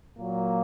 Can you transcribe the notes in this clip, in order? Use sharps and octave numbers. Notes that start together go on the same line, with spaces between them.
A#2 F#3 A#3